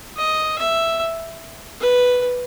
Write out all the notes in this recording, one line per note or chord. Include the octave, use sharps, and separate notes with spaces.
D#5
E5
B4